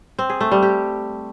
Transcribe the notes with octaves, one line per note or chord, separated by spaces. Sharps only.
C4
G#4
A3
G3
G4